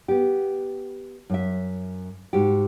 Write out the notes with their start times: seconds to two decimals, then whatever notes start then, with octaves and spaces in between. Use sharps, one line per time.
0.08 B3 G4
1.30 F#2 E5
2.33 G#2 F#4 G4